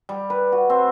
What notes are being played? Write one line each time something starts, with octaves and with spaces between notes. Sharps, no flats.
G3
B4
F#4
C4